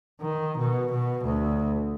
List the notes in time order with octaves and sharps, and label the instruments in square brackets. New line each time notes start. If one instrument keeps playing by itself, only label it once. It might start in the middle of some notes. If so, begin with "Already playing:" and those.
[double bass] D#3
B2
B2
D2